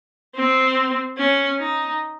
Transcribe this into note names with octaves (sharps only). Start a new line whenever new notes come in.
C4
C#4
D#4